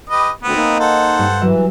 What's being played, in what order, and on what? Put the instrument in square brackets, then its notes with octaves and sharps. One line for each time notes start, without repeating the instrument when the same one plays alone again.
[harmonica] G4 B4 D#5
[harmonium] D2 [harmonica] B3 C4
[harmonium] A#3 D#4
[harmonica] A4 C5 F#5
[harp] G2
[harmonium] E3 [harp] F#3 E5